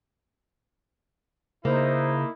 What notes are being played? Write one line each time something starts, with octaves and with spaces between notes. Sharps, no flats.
C#3 A#3 D#4 E4 C5